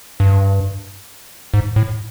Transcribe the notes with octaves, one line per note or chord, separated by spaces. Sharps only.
G2
G#2
A2